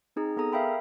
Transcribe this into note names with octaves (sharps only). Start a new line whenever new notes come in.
C4 D#4 G#4 A#5
B3 G#4 A4 A#5 D#6
A#4 E5 F5 G5 B5